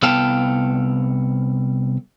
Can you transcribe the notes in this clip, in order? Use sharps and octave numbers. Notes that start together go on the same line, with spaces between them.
C2 B3 A4 F5 G5 A5